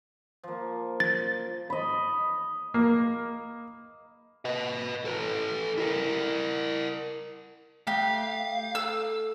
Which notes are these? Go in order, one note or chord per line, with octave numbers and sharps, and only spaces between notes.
F3 A#3
A6
D#5 B5
A#3
B4 D#5
A4 B4
E4 A#4
A3 G4 F5
A4 E6